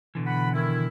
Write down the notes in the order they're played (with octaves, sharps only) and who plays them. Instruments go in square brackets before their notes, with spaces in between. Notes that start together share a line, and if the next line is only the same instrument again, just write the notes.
[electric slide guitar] B2 D3 E3
[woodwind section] F#5 B5
D#3 E4